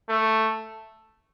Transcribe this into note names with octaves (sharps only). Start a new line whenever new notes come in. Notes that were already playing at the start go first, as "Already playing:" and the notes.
A3